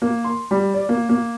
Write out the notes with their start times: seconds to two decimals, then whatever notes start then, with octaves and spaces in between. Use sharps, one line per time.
0.02 A#3
0.24 C6
0.51 G3
0.74 D5
0.89 A#3
1.09 A#3